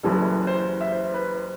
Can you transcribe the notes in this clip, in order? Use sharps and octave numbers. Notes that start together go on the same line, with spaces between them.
F#1 F#2 E3 G3 A4
C5
E5
C5
B4
C5